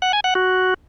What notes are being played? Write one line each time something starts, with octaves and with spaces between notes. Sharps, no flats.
F#5
G#5
F#5
F#4